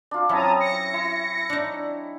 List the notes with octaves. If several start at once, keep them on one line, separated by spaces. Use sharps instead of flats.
D4 F4
F#3 C4 C#4 E4 A5 A#5 D#6
A#6 C#7
E4
D4 D#4